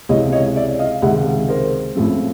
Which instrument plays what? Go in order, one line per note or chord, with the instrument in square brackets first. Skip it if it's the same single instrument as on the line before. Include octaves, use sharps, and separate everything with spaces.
[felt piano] C#2 C3 E3 C#5 D#5
C#5 D#5
D5 E5
D#5 F5
C#2 C3 D#3 E5 F#5
A#4 C5
A1 A2 F3 A3 C4